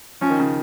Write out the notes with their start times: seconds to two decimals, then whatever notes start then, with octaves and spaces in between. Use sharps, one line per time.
0.21 F3 C#4
0.30 D#3
0.40 C#3